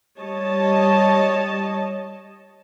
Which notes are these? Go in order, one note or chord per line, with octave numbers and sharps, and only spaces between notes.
G3 C#5 D#5 A5